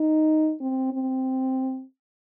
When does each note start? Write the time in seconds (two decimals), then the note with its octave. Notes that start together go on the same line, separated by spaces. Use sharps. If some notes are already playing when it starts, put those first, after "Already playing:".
Already playing: D#4
0.61 C4
0.93 C4